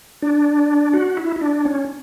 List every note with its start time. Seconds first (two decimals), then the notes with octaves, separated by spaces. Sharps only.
0.22 D4
0.94 F#4
1.17 E4
1.36 E4
1.41 D4
1.65 C#4